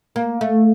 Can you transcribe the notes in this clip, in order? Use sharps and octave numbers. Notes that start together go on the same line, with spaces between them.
A#3
A3